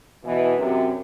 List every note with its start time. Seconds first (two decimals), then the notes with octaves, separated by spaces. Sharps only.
0.25 B2 E3
0.57 F#2 C3